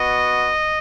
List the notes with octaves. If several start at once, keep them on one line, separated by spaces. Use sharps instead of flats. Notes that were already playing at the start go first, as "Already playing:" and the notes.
Already playing: B3 F#4 D#5